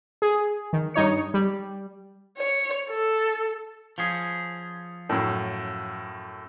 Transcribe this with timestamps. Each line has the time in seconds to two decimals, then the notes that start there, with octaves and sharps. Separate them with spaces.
0.22 G#4
0.73 D#3
0.94 G2 D#4 C#5 C#7
1.34 G3
2.38 C#5
2.90 A4
3.98 F3 C#4 G#4
5.09 F#2 A2